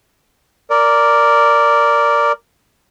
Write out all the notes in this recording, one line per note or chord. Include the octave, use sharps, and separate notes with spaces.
A#4 D5